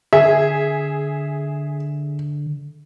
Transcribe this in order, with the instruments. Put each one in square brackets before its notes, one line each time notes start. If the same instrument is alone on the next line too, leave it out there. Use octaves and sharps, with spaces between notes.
[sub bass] D3 [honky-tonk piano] G#4 [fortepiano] E5